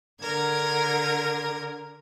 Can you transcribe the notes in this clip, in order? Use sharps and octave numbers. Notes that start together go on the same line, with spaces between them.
D3 A#4 G#6